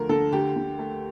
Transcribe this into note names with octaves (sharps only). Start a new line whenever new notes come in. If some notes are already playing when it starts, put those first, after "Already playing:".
Already playing: D2 F3 A3 A#4
D3 A4
D2 G4
D3
A3